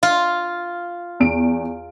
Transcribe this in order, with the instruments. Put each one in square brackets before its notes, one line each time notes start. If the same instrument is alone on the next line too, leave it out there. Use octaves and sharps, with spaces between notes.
[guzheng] F4
[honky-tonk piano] E2 D7